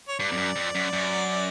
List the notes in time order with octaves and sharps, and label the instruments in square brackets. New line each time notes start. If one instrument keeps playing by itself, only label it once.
[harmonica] C#5
[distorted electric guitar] G2 [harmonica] D5
[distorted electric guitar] F2
F#2
F2
F#2
F#2